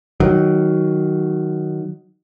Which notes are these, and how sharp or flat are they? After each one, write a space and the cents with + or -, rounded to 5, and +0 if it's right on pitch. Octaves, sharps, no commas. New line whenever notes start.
D#3 +0 F#3 +10